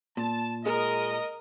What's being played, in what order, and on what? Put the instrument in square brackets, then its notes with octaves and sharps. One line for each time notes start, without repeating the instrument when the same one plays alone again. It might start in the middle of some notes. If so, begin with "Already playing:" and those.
[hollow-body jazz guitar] A#2 [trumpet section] A5
[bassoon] G#3 [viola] A#4 [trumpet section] D#5